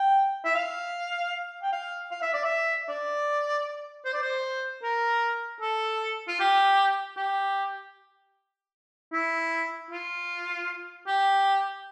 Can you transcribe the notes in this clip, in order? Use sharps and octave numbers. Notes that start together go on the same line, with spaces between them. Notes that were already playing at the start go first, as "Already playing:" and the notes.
Already playing: G5
E5
F5
G5
F5
F5
E5
D5
E5
D5
C5
D5
C5
A#4
A4
F4
G4
G4
E4
F4
G4